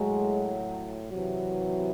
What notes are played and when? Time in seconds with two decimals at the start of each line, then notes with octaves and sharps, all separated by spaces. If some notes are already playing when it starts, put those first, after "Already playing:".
Already playing: A2 F#3 G#3
1.12 C3 E3 F#3